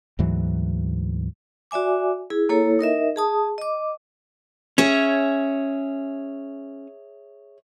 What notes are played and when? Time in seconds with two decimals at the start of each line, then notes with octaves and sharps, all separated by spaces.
0.19 D2 G#2 E3 F#3
1.71 F#4 D5 E5 G#5 D6
2.30 E4 G#4
2.49 A#3 E4 A4 C#5 A#5
2.79 D#4 A#4 D#5 E5
3.16 G#4 A5 D#6
3.58 D#5 D6
4.78 C#4 G#4 C#5 E5